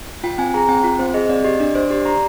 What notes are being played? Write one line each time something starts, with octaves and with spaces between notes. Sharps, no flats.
F4 G5
C4 G#5
G#4 A#5
C4 G5
F4
C4 C5
G#4 D#5
D#5
C4 D5
G4 D#5
D4 D5
D4 C5
G4 D5
G4 A#5